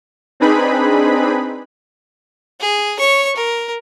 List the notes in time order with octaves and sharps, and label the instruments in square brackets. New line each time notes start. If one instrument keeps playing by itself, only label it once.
[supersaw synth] C4 D4 D#4 G#4 B4 B5
[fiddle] G#4
C#5 C#6
A#4